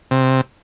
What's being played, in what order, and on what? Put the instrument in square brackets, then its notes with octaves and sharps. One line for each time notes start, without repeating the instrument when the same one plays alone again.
[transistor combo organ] C3